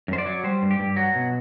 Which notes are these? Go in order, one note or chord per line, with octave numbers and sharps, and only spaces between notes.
F#2 C5
D5
F#3
G3 C5
G2
G4
G2
F#3 F#4
B2